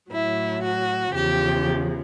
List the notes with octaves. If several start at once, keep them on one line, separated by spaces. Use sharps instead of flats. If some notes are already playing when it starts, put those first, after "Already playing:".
A2 F#3 E4
F#4
E2 C#3 F3 G4